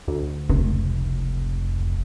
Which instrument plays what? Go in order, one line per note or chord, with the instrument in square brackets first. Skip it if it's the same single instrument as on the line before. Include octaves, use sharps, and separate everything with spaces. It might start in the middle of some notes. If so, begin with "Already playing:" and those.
[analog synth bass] D2
[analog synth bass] F1 [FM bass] C#2